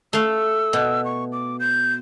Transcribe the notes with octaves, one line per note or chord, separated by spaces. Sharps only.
A3 F5 E6
B2
C#6
D6
G6